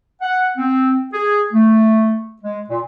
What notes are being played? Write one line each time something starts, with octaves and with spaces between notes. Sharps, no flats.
F#5
C4
G#4
A3
G#3
A#2